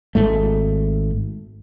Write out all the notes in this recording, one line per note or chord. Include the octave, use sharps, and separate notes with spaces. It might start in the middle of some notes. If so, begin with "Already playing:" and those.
G#1 G#2 A3